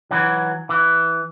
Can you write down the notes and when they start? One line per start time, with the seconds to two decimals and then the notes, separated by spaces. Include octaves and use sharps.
0.11 E3 F#3
0.69 E3